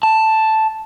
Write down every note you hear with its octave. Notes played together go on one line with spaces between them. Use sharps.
A5